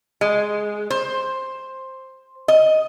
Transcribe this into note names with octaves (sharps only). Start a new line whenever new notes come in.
G#3
C5
D#5